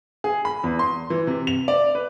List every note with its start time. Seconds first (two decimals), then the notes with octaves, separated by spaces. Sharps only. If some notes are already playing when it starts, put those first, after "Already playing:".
0.24 G#4
0.45 B5
0.64 E2
0.79 C6
1.10 E3
1.27 C3
1.47 F7
1.68 D5
1.95 B4